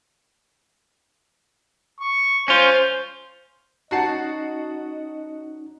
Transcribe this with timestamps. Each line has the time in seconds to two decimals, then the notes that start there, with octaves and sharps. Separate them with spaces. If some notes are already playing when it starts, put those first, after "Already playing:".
2.00 C#6
2.48 C#4 F4 C5
3.91 C#4 D#4 F#4 D#5 F#5 A5 C7